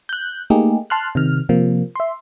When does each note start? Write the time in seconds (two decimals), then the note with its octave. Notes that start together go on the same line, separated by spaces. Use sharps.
0.09 F#6 G6
0.50 A3 A#3 D#4 G4 G#4
0.90 A5 C6 F6 F#6
1.15 C3 D#3 F6
1.49 C3 F3 A#3
1.96 E5 C6